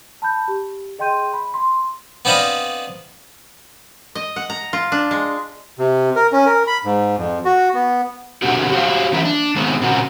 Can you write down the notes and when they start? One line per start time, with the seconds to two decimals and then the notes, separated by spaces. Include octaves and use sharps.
0.22 A5 B5 G6
0.48 G4
0.99 G#4 D#5 G5 C6 G6 D#7
1.33 B5
1.54 C6
2.25 B3 C4 D4 D#5 F5 B5
4.15 D#5
4.36 F#5
4.50 A#5
4.73 F4
4.92 D4
5.11 G#3
5.79 C3
6.16 A#4
6.33 C#4
6.46 A#4
6.67 B5
6.84 G#2
7.17 F2
7.45 F#4
7.74 B3
8.42 B2 D3 A#3 C4 F#4 G4
8.72 F#4 G4 C5 F5
9.13 E3 A#3 C#4 E4 A#4 E5
9.25 D4
9.56 D#3 G#3 B3 C4
9.82 A#2 C#3 C4 F#4 A#4